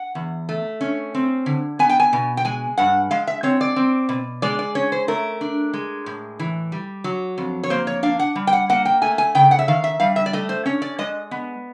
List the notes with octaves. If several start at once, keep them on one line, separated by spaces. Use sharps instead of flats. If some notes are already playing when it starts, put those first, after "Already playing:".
Already playing: F#5
E2
A3
C#4
C4
D3
B3 G#5
G5
G#5
B2
G5
G#3 G#5
G2 F#5
G#3 F5
E5
C4 C#5
D5
C4
B2
G#3 D5
D5
C#4 C#5
C5
A3 A#4
D4
G#3
A2
E3
G3
F#3
F2
C#5
A#3 C5
C#5
D4 F5
F#5
G3
G5
F#5
A#3 F#5
G5
A3 G#5
G#5
C#3 G5
F#5
E5
D#3 F5
E5
G3 F5
E5
D5
A3 D#5
C5
C#4 C#5
D5
G#3 D#5
B3